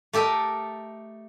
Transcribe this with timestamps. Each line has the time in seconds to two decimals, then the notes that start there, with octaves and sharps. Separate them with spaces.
0.13 A3 G4 A4 A#4 D#5